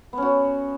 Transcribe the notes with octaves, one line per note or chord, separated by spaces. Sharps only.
B3 C#4 F#4